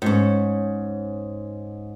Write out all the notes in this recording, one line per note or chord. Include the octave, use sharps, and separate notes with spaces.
G#2 C#4